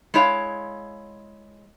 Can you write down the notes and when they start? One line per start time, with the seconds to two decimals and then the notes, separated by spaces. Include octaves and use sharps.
0.14 G#3 E4 C#5 F5